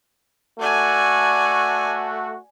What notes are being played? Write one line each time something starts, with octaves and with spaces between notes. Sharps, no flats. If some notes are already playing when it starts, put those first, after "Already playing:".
A3 F#4 D5 G#5